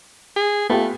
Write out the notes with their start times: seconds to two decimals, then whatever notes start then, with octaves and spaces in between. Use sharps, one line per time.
0.36 G#4
0.70 A3 B3 F4 G4